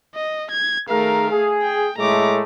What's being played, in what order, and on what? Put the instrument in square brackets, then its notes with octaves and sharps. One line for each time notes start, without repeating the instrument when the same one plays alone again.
[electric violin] D#5
G#6
[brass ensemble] D#3 G#4 A#4 [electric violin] A3 F5
[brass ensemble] G#4
[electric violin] G5
[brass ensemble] A2 G#3 A3 [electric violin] A#5 D6